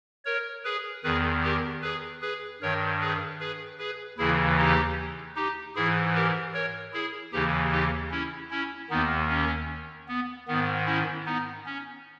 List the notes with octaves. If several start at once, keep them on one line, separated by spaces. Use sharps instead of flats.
A#4 C#5
G#4 B4
E2 D#3 G#4 B4
G4 A#4
G#4 B4
G#4 B4
G2 D#3 A#4 C#5
G#4 B4
G#4 B4
G#4 B4
D#2 C#3 E3 E4 G#4
D#4 G4
D#4 G4
G#2 E3 E4 G#4
G4 A#4
A#4 C#5
E4 G#4
D#2 C#3 E3 D#4 G4
D#4 G4
C#4 E4
C#4 E4
D#2 D#3 B3 D#4
C#4
B3
G#2 D#3 B3
C#4 E4
B3 D#4
C#4